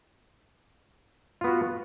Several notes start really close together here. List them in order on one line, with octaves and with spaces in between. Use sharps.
F4 B3 F#4